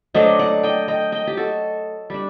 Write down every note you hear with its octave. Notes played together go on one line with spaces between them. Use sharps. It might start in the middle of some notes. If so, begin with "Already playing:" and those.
F#3 A3 D4 C5 D#5
D5 F#5
D#5 G5
D#5 G5
D#5 G5
G4
F#4 A4
G3 D4